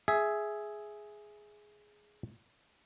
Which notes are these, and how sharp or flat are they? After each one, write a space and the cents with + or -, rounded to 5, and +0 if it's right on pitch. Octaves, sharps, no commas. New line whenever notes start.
G#4 +5 E5 +0